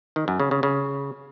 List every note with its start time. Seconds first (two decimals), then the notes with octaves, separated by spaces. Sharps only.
0.16 D#3
0.28 F#2
0.40 C#3
0.51 C#3
0.63 C#3